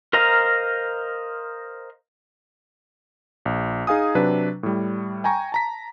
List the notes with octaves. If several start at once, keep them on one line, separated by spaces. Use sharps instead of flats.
A#4 C5 D#5 F5 A#5
A#1
D#4 G#4 F5 G#5 D#6
C3 F#3 D4 B4
A2 G3
G5 G#5 A#5 C#6
A5 A#5 B6